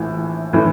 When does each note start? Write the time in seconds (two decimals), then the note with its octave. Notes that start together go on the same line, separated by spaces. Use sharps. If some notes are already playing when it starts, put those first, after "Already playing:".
Already playing: A#1 A2 E3
0.53 A2 E3